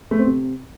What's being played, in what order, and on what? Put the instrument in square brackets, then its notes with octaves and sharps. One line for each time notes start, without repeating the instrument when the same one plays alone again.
[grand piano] A3
C4
C3